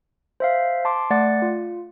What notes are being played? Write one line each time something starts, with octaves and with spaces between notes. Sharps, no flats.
C5 E5 F5
A5 C6 D6
A3 D5 F#5 A6
F4